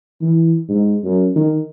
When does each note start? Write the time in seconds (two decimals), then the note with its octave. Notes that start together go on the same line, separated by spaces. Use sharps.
0.22 E3
0.69 G#2
1.04 F#2
1.36 D#3